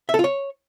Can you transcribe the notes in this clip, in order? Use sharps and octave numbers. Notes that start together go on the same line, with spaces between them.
E5
A4
F4
C#5